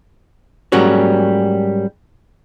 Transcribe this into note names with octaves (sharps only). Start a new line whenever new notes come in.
G#2 F#3 G3 A#3 C#4 F#4